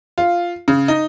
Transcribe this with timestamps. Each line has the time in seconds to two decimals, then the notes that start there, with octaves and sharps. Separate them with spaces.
0.18 F4
0.68 C#3
0.88 D#4